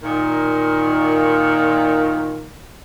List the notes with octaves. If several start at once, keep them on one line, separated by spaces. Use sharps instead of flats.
A#2 D#3